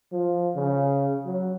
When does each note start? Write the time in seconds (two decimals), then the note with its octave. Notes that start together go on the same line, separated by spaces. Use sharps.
0.12 F3
0.55 C#3
1.26 F#3